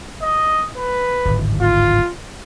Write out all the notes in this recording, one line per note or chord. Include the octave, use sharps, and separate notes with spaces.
D#5
B4
D1 G#1
F4